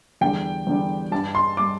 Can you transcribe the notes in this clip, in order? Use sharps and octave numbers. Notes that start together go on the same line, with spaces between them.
E2 D3 G3 G5
E2 D3 G3
G2 G3 A5
C6
G3 D6